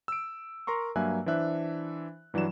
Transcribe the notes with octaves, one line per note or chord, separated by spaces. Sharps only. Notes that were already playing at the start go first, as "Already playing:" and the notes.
E6 D7
A#4 A#5 C6 C#6
G2 F#3 A#3 E5 G#5 F#6
E3 D4 C5 E5 F#6
G2 E3 F#3 D5 E7